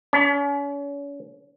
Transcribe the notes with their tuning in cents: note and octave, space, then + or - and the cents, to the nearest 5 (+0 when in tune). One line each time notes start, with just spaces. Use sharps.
C#4 +40